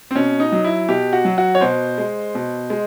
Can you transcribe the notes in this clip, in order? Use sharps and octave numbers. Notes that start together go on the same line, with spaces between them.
C4
B2 C#4
D#4
F#3
E4
B2 G4
F#4
F#3
F#4
C#5
B2 C5
G#3
B2
G#3